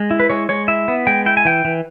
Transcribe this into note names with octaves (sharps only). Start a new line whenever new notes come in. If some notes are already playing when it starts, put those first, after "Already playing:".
Already playing: G#3
E4
B4
G#3 C#5
G#3 C#5
E4 E5
B3
G#3 G5
E4 G5
G#5
E3 G5
E3